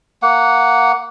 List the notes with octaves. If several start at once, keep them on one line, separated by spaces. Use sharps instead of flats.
A#3 F#5